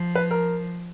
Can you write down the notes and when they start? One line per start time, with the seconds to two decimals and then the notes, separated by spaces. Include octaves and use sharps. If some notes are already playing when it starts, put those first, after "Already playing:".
Already playing: F3
0.15 B4
0.31 A#4